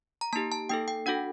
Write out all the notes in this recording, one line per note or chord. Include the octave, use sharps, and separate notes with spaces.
A#5
A#3 D#4 G4 A5
A5
A#3 D#4 A4 G5
G5
D4 F#4 A4 F#5